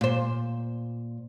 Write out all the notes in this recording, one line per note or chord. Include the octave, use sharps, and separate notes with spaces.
A#2 C5